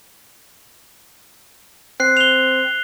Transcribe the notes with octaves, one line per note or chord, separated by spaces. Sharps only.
C4 F#6 C7
F7 G7